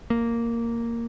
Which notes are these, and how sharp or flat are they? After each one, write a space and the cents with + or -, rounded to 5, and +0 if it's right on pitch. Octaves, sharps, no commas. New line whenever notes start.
A#3 -5